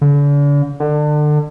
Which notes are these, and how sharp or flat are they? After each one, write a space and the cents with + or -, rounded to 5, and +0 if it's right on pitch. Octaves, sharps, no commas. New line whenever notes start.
D3 -40
D3 +30